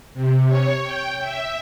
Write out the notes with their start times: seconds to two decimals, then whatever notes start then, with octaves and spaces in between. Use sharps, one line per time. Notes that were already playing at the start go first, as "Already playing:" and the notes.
0.14 C3
0.46 C#5
0.83 G5
1.20 E5